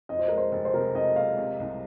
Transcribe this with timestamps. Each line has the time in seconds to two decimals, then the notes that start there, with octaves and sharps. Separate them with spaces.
0.09 F2 D#5
0.19 C5
0.28 G#3 A#4
0.37 C5
0.52 F1
0.65 C5
0.74 C3 A#4
0.95 F2 D#5
1.16 G#3 F5
1.38 C3
1.60 C2